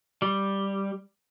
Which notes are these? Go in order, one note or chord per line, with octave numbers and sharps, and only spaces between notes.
G3